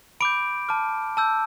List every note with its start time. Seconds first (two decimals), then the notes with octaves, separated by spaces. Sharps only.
0.20 B5 D6 G6 D7
0.69 A5 D6 F6
1.17 A5 E6 G6